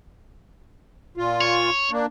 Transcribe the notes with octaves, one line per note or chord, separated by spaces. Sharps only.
A#2 F4
C#5
A#3 D4